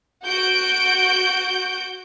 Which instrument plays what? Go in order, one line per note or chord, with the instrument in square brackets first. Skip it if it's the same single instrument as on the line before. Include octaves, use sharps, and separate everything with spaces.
[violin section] F#4 G6 D7